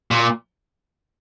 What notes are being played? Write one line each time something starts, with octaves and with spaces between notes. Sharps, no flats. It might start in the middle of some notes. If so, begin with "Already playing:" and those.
A#2